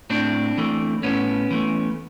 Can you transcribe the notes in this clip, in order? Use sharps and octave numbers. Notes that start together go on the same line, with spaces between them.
A2 C4 D4
E3 A3
A2 B3 C#4
E3 A3